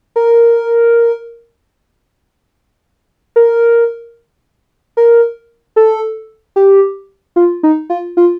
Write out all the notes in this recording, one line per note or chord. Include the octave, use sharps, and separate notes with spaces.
A#4
A#4
A#4
A4
G4
F4
D#4
F4
F4